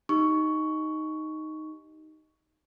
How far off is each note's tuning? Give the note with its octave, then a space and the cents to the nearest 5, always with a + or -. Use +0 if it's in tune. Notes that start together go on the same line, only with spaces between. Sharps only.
D#4 +0 G4 -15 C#6 +10